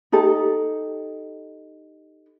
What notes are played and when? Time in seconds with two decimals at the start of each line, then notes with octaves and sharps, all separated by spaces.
0.12 D#4 G4 A4